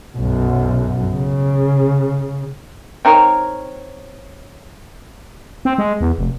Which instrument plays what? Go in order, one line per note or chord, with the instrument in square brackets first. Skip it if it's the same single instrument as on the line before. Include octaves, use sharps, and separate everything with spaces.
[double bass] B1 F#2
C#3
[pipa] C4 D#4 A#4 C#5
[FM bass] C4
G#3
E2
F1